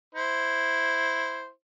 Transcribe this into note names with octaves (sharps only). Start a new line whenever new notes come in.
E4 C5